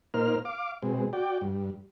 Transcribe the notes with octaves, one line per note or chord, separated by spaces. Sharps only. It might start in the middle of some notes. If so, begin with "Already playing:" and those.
A#2 A#3 D#4 A#4 C5 F6
F5 D6
B2 G#3 C4
F#4 D5 G5
G2